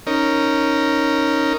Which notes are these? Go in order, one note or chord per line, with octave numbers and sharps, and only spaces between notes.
C#4 D#4 A#4